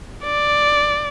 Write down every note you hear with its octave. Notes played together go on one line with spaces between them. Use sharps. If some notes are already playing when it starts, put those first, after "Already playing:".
D5